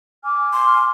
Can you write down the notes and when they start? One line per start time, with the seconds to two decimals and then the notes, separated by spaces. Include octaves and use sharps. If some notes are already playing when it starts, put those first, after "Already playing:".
0.24 G#5 D6 F6
0.53 C6